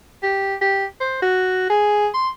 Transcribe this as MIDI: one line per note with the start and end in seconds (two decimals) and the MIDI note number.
0.23 0.55 67
0.61 0.85 67
1.00 1.19 72
1.22 1.65 66
1.70 2.08 68
2.14 2.29 84